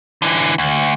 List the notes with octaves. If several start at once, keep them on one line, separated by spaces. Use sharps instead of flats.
D3 E3
D2